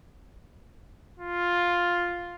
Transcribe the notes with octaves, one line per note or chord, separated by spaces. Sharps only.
F4